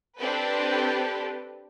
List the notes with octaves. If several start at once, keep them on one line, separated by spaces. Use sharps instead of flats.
C4 D4 G4 A4 B4